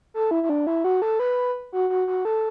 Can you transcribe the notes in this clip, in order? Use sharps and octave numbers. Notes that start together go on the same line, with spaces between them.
A4
E4
E4
D4
E4
F#4
A4
B4
F#4
F#4
F#4
A4